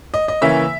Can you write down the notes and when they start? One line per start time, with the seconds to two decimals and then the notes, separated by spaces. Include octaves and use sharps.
0.14 D#5
0.28 D#5
0.42 C#3 E3 A#3 C#4 E5